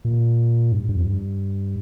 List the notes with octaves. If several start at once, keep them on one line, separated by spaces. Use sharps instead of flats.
A#2
G2
G2
F2
G2